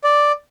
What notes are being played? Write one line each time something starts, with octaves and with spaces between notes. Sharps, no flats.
D5